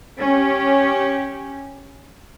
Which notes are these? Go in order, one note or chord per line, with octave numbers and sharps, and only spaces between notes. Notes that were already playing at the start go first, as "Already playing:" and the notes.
C#4 G4